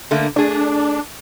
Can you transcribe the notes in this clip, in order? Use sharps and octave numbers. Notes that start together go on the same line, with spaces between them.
D3 A3 A#3
A3 D4 G#4